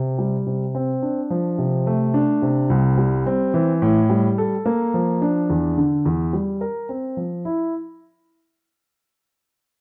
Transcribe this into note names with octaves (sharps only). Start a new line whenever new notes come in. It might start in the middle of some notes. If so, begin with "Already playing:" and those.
Already playing: C3
G3
C3
C4
D4
F3
C3
A3
D4
C3
C2
G3
C4
E3
A2
G3
A4
A#3
F3
D4
E2
D3
E2
G3
A#4
C4
F3
E4